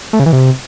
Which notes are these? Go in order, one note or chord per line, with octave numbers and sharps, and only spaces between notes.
A3
C#3
E3
C3